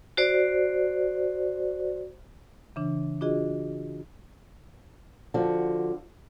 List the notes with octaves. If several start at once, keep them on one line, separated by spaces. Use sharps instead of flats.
F#4 C5 D5
C#3 E3 D4
D4 F4 F#4 G#4 D#5
D3 F3 F#4